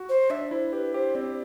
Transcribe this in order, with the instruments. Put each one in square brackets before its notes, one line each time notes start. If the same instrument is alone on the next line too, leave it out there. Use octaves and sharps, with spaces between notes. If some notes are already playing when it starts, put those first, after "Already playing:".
Already playing: [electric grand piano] F#4
[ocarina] C5
[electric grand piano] D4 [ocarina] E5
[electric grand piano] E4 [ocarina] C5
[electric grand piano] G4 [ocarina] B4
[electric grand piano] G4 [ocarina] C5
[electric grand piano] C4 [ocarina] D5